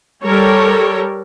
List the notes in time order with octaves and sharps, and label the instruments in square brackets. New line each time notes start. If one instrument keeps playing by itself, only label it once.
[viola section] G3 A4 A#4 C#5